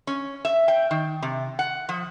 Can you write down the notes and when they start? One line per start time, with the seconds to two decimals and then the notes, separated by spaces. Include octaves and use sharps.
0.07 C#4
0.45 E5
0.68 G5
0.91 D#3
1.23 C3
1.59 F#5
1.89 F3